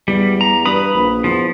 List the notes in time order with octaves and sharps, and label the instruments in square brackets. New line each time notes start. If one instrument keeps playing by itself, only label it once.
[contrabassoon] E2 [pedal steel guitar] G3
[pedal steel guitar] A#5
[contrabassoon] G2 [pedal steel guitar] B4 B5 D#6
[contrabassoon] A#1
[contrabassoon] E2 [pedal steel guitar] F3